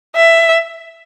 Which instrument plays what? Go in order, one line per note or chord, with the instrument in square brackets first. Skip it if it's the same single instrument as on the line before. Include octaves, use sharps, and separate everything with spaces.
[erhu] E5